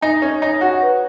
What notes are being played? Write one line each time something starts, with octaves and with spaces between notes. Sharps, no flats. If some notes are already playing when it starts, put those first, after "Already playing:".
D#4 G#5
C#4 C#5
D#4 C#5
F#4 F#5
B4